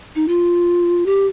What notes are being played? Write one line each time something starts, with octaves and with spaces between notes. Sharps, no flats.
D#4
F4
G4